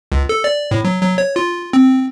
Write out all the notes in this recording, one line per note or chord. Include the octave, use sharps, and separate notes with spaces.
C#2
A4
D5
A2
F#3
F#3
C#5
F4
C4